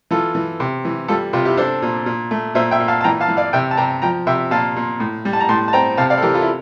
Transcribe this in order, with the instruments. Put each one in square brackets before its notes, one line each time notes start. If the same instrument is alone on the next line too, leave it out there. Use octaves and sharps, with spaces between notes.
[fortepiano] E3 F4 A4
E3
C3
E3
G3 F4 A4
C3 F4
E4 G4
D4 A4 C5
A#2
A#2
A3
A#2 C5 E5
E5 G5
A#2
F5 A5
A5
E3 G5 A#5
F5 A5
E3
D5 F5
C3 E5 G5
A5
C3 G5 A#5
F3 G5 A#5
C3 E5 G5
A#2 F5 A5
A#2
A2
G3
A5
A#5
A2 A5 C6
A5
C4 G5 A#5
C3 F5 A5
D5 F5
A4
E3 G4 A#4
F4 A4
E4